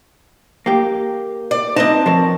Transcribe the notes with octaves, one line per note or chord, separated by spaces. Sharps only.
A#3 G4
D5
C4 D#4 B4 D#5 A5
F3 A#4 C#5